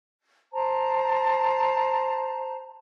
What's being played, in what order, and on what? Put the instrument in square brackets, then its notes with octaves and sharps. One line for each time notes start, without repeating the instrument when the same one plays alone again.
[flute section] C5 A5 A#5